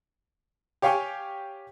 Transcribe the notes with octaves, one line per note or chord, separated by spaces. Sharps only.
G4 C#5 F5 G5 G#5 C#6